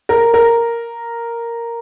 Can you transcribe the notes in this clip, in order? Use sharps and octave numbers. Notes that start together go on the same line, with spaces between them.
A#4
A#4